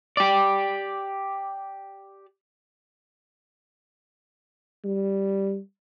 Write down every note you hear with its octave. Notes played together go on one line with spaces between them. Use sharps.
G4 D5
G3